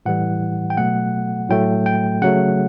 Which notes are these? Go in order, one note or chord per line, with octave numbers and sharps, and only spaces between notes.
A2 E3 G3 F#5
G5
B2 F#3 A3 F#5
A2 F#3 A3 G5
G5
C#3 F#3 A3 F#5